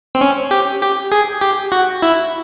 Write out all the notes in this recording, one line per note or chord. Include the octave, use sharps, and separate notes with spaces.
C4
C#4
G4
G4
G#4
G4
F#4
E4